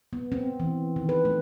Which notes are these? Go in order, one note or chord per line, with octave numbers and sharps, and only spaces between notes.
B3
C4
E3
D#3
B4
A3